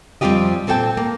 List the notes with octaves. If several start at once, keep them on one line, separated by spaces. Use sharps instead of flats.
F2 G3 C4 F4 G4 D#5
A#2 C4 A4 C5 G5 A5
A#3